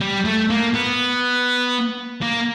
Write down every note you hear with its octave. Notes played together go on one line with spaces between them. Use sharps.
G3
A3
A#3
B3
A#3